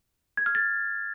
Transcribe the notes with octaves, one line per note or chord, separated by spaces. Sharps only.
G#6
F6
A6